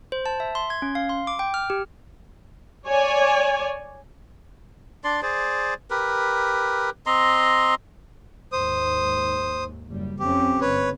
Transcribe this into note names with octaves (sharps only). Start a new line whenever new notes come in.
C5
A5
E5
C6
G#6
C#4
F5
C6
D6
G5
F6
G4
C#5 D5 G#5
D4 D5 C6
G#4 C5 D5
G4 A#4 B4
C4 D#5 A#5 C6
D#2 G#2 C5 D#6
F#1 G3
F2 C4 C#4 G4
G1 B4 C#5